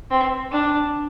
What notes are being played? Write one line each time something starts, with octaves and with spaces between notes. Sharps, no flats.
C4
D4